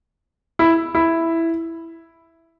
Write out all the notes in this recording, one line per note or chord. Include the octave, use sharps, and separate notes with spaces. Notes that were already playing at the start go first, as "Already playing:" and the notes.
E4
E4